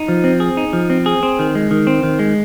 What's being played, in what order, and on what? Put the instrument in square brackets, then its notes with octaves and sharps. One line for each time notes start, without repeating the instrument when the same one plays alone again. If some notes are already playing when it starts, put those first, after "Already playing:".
Already playing: [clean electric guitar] D#4
F3
C4
G#4
D#4
F3
C4
G#4
C4
D#3
G#3
D#3
C4
D#3
G#3